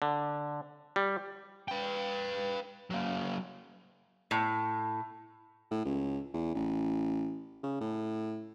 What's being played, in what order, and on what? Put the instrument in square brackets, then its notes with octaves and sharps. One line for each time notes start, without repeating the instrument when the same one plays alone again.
[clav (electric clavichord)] D3
G3
[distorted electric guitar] B4 G5
F#3 A#3
[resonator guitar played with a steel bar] A2
[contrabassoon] A2
C#2
E2
A1
C#3
A2